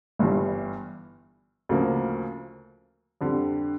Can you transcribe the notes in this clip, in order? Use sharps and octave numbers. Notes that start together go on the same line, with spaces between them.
G1 G2 E3 G3
D2 C#3 F3 A#3
F2 D3 G3